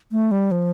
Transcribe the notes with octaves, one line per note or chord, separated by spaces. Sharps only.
A3
G3
F3